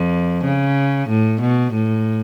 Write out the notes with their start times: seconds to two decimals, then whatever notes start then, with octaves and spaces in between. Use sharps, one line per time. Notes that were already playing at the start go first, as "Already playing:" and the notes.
Already playing: F2
0.45 C#3
1.10 A2
1.42 B2
1.74 A2